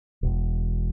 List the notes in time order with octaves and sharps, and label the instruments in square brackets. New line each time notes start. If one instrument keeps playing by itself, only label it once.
[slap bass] E1